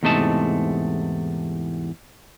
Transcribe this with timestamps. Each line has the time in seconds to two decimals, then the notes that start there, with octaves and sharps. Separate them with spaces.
0.03 E2 G#2 C3 A3 D#5 A5